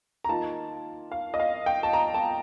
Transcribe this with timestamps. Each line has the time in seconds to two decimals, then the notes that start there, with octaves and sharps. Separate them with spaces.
0.24 A#5
0.29 D#3 A#3 F4 A5
1.12 F5
1.34 D#5
1.39 F5
1.66 G5
1.83 A5
1.93 A#5
2.14 A5